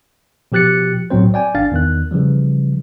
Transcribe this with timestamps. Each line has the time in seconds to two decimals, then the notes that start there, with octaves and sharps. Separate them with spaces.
0.52 B2 F3 G4 F#6 A6 C#7
1.10 B1 A2 F#3 C4 C5
1.34 D5 G5 G#5
1.55 G#1 D4 F5 A6
1.72 E2 D#3 F#6
2.11 C#3 E3 F3 G3